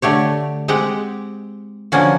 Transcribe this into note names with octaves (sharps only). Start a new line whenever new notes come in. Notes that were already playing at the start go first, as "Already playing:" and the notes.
D3 A3 G4 C#5
G#3 C4 G4 F#5 G5
D3 F3 A#3 C#4 F#4